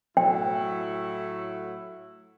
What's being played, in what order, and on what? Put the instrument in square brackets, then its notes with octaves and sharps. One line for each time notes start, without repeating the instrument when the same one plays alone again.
[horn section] A2 F#3 A3 E4 [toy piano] G5